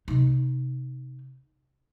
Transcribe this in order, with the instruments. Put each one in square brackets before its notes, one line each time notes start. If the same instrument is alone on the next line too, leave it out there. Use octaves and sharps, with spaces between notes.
[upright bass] C3 D#4